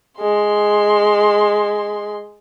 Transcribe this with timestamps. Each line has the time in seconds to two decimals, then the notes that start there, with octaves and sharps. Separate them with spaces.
0.20 G#3 C6